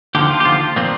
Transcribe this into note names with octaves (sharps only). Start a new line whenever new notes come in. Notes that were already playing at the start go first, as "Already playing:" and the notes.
D#2 D3 F3 G4
F4
G4
D#2 D3 F3 F4
A#2 F3 C4